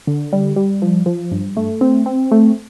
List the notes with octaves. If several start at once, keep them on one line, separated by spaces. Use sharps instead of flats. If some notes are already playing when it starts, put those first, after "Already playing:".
D3
G3
G3
F3
F3
G2
A3
C4
C4
A3